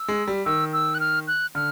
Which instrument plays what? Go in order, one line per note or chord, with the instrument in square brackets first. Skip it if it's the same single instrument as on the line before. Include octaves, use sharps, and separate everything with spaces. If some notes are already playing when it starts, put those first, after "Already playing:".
Already playing: [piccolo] E6
[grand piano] G#3
G3
[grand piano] D#3 [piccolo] E6
[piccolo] E6
F#6
F6
F#6
[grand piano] D3 [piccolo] F6